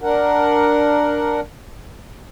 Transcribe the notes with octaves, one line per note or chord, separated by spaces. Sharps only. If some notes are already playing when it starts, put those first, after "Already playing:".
D4 A#4 F#5